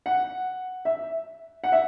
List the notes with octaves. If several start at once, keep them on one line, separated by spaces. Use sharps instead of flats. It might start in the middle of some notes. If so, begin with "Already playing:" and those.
F#5
E5
F#5
E5